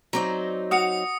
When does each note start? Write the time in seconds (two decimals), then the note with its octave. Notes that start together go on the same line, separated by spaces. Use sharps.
0.13 F#3 C4 D#4 D5 A#5
0.71 F#4 F5 D#6 C#7